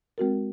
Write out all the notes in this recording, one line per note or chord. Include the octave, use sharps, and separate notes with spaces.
G#3 C4 F#4 A#4